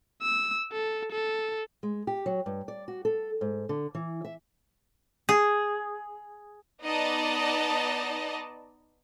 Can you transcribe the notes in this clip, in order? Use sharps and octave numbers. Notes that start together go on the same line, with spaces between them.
E6
A4
A4
G#3
G4
F#3
G2
D5
F#4
A4
G#2
D3
E3
E5
G#4
B3 D#4 D5 D#5 A5